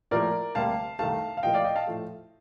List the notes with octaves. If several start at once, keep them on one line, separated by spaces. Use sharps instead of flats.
A2 F3 A#3 A#4 D5
D2 C3 G3 A#3 F5 A5
C2 C3 D#3 A3 F5 A5
F5
A2 F3 A#3 D#5 G5
D5 F5
D#5 G5
F5 A5
A2 F3 A3